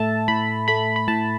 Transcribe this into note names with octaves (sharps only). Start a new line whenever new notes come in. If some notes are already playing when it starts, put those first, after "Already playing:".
Already playing: A2 A3 E5 A5
A2 B5
A3 B5
B5
A2 A5